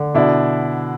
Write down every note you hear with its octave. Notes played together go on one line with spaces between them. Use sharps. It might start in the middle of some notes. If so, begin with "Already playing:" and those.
Already playing: D3
B2 D4 E4